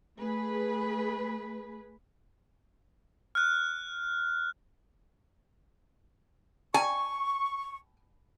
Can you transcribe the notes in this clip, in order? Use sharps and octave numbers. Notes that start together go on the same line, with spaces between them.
A3 G#4 B4
F6 F#6
G#5 C#6